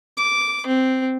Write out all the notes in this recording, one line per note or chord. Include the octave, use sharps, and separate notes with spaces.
D6
C4